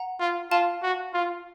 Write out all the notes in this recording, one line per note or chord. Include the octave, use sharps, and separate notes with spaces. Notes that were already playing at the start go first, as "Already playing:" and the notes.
Already playing: F#5 A#5
F4
F4 F5 A5
F#4
F4